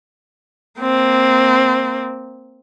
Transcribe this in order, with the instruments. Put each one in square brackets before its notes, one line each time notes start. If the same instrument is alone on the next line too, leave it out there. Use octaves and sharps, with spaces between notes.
[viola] A#3 C4